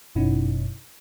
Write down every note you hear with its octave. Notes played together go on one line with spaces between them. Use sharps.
G1 F#2 B2 C#4 D#4 E4